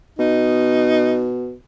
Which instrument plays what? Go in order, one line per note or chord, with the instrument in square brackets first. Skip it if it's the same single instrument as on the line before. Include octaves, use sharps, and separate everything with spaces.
[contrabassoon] B2 [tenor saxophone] D#4